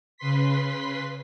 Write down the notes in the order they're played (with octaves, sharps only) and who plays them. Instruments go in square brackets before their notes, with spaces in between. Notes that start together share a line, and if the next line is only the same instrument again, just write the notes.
[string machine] C#3 B4 C6 B6